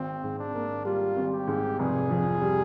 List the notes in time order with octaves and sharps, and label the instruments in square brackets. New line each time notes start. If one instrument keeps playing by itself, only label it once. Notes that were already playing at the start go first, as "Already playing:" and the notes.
Already playing: [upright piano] G#1 [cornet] C4
[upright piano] G#2
[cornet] D4
[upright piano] A#3
[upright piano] G3 [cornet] F4
[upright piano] G#1
[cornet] G4
[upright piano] G#2
[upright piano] F1 [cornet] G#4
[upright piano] F2
G3